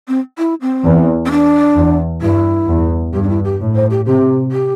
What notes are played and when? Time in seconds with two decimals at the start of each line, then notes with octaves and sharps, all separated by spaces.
0.08 C4
0.38 E4
0.61 C4
0.84 E2
1.26 C4
1.31 D4
1.76 E2
2.22 G2 E4
2.69 E2
3.14 G2 G4
3.23 D4
3.29 E4
3.44 G4
3.61 A2
3.76 C5
3.90 G4
4.06 C3 G4
4.52 G4